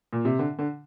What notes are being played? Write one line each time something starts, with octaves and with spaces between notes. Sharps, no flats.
A#2
C3
D3
D3